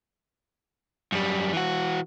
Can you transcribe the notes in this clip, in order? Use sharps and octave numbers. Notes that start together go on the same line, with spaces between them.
F#2 G3
E3 F#4